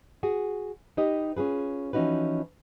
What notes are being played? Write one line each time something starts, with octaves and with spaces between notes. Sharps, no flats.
F#4 G#4
D#4 G4 B4 D#5
C#4 F4 G#4 B4
E3 F3 C#4 D#4 F#4 B4